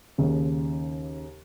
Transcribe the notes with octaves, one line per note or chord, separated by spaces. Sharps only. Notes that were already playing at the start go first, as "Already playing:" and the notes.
D#2 C#3